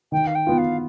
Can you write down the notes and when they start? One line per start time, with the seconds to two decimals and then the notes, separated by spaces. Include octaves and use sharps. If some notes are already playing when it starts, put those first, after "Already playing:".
0.12 D#3 G5
0.27 F5
0.35 G5
0.47 B3 F4
0.58 F5